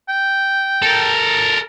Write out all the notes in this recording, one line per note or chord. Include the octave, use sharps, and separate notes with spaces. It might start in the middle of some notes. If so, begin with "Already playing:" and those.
G5
A4 A#4